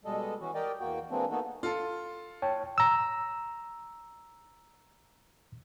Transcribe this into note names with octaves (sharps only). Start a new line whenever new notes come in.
B2 G3 G#3 A4 D#5
E3 C#4 F#4
G4 A#4 D5 D#5 G5
E2 A#3 F#4 G5
E3 G#3 A#3 C4 D4
A#3 B3 D#4 F#4 A4
F4 A4
C#5 G5 A5
A#5 E6